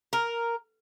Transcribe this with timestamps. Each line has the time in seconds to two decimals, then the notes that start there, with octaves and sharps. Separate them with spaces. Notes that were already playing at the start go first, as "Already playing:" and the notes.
0.13 A#4